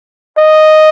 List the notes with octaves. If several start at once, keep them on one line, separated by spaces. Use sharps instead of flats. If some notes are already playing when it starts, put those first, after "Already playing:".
D#5